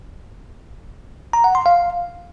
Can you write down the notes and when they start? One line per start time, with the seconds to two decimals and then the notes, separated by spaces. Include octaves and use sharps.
1.33 A#5
1.44 F#5
1.55 C6
1.66 F5